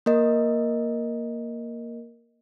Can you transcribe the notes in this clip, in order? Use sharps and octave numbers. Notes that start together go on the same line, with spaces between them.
A#3 A#4 D#5